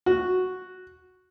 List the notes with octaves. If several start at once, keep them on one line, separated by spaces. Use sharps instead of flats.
F#4